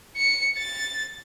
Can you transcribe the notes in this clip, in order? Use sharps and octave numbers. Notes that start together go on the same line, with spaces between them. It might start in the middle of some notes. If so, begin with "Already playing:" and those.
C#7
A6